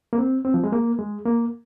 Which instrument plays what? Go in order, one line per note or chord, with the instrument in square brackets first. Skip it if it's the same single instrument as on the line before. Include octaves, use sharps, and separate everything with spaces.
[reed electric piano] A#3
C4
C4
F3
G#3
A#3
G#3
A#3